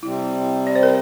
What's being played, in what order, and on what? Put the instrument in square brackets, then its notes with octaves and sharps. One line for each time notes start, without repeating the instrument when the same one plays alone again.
[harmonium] C3 G3 C4 [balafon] E4
[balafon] D5
C5
A#4